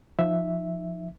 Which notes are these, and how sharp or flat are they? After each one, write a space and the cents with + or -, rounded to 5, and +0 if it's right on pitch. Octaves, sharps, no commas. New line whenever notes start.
F3 +0 D#4 +0 E5 +0